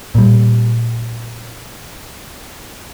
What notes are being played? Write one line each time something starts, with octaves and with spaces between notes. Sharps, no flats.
A#2 G3